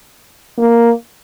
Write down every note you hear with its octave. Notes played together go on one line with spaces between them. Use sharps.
A#3